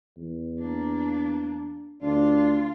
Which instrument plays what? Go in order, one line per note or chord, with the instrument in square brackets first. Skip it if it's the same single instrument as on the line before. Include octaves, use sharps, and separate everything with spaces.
[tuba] E2
[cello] A#3 D4
[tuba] D2 [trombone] D4 [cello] F4